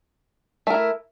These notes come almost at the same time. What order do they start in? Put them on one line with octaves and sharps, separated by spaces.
A3 A#4 E4